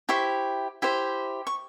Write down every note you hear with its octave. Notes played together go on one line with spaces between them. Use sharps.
E4 G4 C5 C#6
E4 G4 C5
C#6